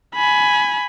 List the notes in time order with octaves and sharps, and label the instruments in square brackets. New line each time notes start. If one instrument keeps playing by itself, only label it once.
[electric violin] G#5 B5